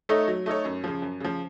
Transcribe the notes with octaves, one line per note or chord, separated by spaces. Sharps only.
A3 D#4 A4 C#5
F#3
A3 D#4 A4 C#5
F#2
C#3 F3
F#2
C#3 F3